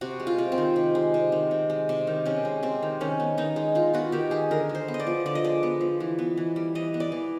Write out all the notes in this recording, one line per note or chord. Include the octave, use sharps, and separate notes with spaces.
C3 F#4
G#3
F4
C3
C4
D#3
C3
G#3
C3
D#3
C3
G#3
C3
D#3
C3 C#4
G#3
C3 C4
D#3
D#3 C#4
B3
D#3 D#4
G#3
D#3 F4
B3 F#4
D#3 G4
G#3 G#4
D3 A#4
G#3
C5
B3
D#5
D5
F3
D3 D5
D#5
G#3 D5
B3
F3
E3
B3
E3
G3
E3 D#5
B3
D5
E3